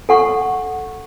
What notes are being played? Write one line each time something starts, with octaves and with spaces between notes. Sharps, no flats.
A4 F#5 C#6